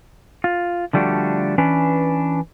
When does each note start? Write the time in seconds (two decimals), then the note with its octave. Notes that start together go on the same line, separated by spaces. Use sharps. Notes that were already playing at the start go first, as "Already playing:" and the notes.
0.44 F4
0.93 D3 F3 G3 A3 D4 F#4
1.58 E3 C#4 D4 B4